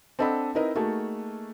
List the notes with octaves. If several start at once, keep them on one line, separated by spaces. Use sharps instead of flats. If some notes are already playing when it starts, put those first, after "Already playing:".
C4 D4 A4 D#5 F#5 B5
C4 D#4 E4 A#4 B4 D#5
A3 A#3 D#4 F#4 G#4 A4